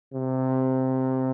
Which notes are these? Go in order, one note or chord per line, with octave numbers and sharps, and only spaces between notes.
C3